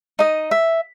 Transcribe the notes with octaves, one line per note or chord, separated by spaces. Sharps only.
D#4 D#5
E5